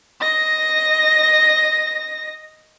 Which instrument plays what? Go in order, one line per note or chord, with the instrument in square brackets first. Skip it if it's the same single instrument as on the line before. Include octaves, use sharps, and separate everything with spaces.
[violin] D#5 A#6